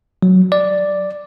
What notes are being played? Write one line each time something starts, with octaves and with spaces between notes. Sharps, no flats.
F#3
D5